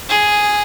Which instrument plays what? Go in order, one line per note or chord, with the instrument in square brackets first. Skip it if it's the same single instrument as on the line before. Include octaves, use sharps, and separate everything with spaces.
[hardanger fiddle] G#4